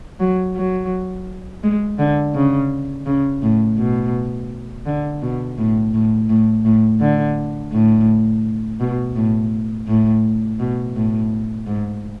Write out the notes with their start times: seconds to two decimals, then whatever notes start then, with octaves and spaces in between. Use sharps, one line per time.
0.20 F#3
0.56 F#3
1.63 G#3
1.99 D3
2.35 C#3
3.06 C#3
3.42 A2
3.78 B2
4.86 D3
5.22 B2
5.58 A2
5.94 A2
6.29 A2
6.65 A2
7.01 D3
7.72 A2
8.80 B2
9.16 A2
9.88 A2
10.59 B2
10.95 A2
11.67 G#2